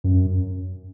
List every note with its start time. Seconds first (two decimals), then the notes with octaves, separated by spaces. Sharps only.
0.04 F#2